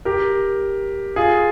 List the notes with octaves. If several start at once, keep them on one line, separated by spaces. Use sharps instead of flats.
G4 A#4
F4 G#4